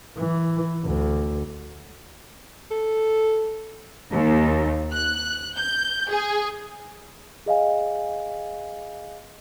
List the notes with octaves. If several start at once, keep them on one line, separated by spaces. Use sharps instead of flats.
E3
D2
A4
D#2
F#6
G6
G#4
G#4 D#5 F5 G#5